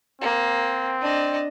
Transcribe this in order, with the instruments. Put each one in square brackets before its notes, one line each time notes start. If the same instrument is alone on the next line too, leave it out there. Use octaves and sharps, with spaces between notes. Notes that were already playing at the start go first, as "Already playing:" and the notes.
[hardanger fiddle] A#3 [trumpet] C4
[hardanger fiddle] D4 D#5